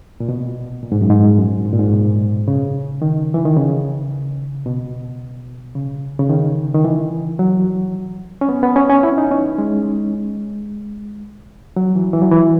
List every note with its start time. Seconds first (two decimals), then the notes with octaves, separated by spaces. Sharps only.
0.20 A#2
0.29 B2
0.83 A#2
0.92 G#2
1.01 F#2
1.10 G#2
1.38 F#2
1.64 G#2
1.73 A#2
1.79 G#2
1.93 B2
2.48 C#3
3.02 D#3
3.34 E3
3.45 D#3
3.56 C#3
4.66 B2
5.75 C#3
6.19 C#3
6.29 D#3
6.75 D#3
6.84 E3
7.39 F#3
8.41 C#4
8.49 B3
8.63 B3
8.76 C#4
8.90 C#4
9.03 E4
9.18 D#4
9.31 C#4
9.58 G#3
11.76 F#3
11.96 E3
12.14 E3
12.22 F#3
12.32 E3